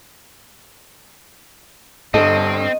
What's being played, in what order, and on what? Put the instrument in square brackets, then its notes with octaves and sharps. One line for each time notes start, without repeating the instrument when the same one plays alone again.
[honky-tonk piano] G1 A4 [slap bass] G2 [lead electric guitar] C4 [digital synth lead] D#5